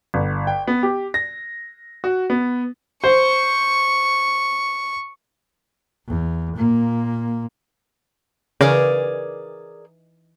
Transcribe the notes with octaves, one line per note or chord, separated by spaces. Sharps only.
G1
G5
B3
G4
A#6
F#4
B3
C5 C#6
E2
A#2 A#3
C#3 E3 D#4 G#4 A#4 D5